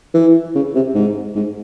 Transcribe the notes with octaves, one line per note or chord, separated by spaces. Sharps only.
E3
C#3
C3
G#2
G#2